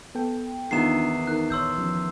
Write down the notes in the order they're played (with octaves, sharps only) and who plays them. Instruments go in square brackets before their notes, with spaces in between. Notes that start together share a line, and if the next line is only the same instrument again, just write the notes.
[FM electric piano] B3 A4 G5
[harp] E2 D#3 [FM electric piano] D4 D#4 F4 [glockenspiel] C7 E7
[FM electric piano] D#4 A#4 [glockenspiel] F#6
[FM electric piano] A#1 C#5 [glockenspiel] C6 E6 G6
[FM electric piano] F3 C#4